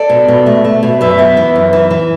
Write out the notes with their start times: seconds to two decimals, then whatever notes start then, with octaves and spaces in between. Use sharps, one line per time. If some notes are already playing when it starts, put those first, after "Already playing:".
Already playing: A4 D5
0.10 B2
0.28 B2
0.46 A3
0.64 A3
0.83 B2
1.01 F#2 B4 E5
1.19 B3
1.37 E3
1.56 F#2
1.73 E3
1.91 E3